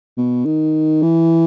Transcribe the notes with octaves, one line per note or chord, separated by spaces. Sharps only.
B2
D#3
E3